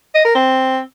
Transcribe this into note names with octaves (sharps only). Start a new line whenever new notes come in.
D#5
A#4
C4